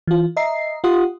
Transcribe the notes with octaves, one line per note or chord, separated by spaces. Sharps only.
E3 F4
D#5 E5 A#5 C7
F4 G4 F#5 C6 D#6